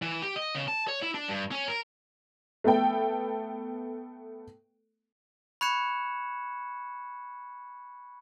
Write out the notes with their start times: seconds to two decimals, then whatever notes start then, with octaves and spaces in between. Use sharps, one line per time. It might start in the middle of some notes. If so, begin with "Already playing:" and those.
0.02 E3
0.22 G4
0.36 D#5
0.55 C#3
0.68 A5
0.88 C#5
1.02 E4
1.14 D4
1.28 G2
1.51 C#4
1.68 A#4
2.64 A3 B3 A4 G5
5.61 B5 C#6 F#6 G#6 C#7 E7